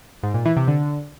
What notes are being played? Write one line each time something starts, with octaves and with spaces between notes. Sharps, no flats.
G#2
A#2
E3
C3
D3